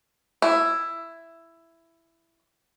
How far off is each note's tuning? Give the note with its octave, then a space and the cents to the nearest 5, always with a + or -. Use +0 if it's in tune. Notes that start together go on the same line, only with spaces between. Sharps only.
E4 +10